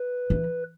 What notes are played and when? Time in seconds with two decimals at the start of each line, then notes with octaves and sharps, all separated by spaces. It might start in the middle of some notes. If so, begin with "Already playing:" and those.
Already playing: B4
0.30 E3